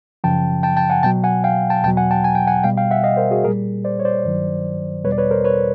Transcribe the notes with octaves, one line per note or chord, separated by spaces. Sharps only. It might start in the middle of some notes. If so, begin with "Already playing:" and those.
F#2 C#3 F3 G5 A5
G5 A5
G5 A5
F#5 G#5
B2 F#3 G5 A5
F#5 G#5
F5 G5
G5 A5
E2 B2 F#3 G5 A5
F#5 G#5
G5 A5
G#5
G5
F#5 G#5
B2 G3 F5 G5
F5 G5
E5 F#5
D#5 F5
A#4 C5
F#4 G#4
A#2 G3 G#4 A#4
C5 D5
C#5
C5 D5
G2 D#3 F#3
E2 B2 G3 B4 C#5
D5
B4 C#5
A#4 C5
B4 C#5